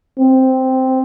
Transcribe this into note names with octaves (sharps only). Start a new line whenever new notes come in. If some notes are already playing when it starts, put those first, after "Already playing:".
C4